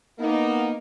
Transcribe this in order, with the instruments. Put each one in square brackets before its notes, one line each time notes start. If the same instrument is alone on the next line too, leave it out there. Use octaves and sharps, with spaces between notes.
[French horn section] A#3 D#4 [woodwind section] B3